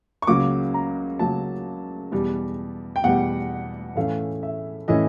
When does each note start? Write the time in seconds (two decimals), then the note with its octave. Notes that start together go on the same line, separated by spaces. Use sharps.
0.22 C#6
0.27 C#2 C#3 F#3 A#3 D6
0.74 A#5
1.19 C#2 C#3 F#3 A#3 A5
2.12 E2 B2 G3
2.96 G5
3.03 E2 B2 G3 F#5
3.96 A2 E3 A3 C#4 F5
4.43 E5
4.88 A2 E3 A3 C#4 D#5